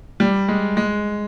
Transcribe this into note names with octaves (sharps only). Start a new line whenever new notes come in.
G3
G#3
G#3